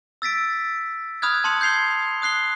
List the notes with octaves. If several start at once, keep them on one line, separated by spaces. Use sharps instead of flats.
E6 A6 B6 D7
B5 D#6 F6 F#6 G#6
A5 C6 D#6 C#7 F7
G6 G#6 C7 F7 G7
D#6 F#6 C7 G7